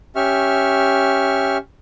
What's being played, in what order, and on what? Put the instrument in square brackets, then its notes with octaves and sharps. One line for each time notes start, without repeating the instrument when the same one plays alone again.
[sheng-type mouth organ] C#4 G4 E5 C#6 F6